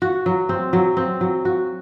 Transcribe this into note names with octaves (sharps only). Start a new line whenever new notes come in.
F#4
F#3
C4
F#3
C4
F#3
F#4